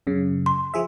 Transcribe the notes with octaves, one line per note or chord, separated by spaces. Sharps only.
F#2 C#3
C6
F3 G#4 E5